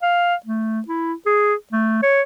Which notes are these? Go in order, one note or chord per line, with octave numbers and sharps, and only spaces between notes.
F5
A3
E4
G#4
A3
C#5